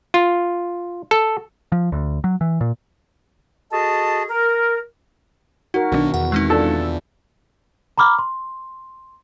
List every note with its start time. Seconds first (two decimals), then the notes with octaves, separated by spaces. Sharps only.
0.14 F4
1.11 A4
1.72 F3
1.92 D2
2.24 F#3
2.41 E3
2.61 A#2
3.72 F#4 G#4 A4 D#5 A5
4.30 A#4
5.74 D#4 F#4 A#4
5.92 B1 B2 D#3 F#3 D4
6.14 E2 F#5
6.32 G#3 C4 D#4
6.50 D4 F4 A4
7.98 A#5 B5 D6 F6
8.19 C6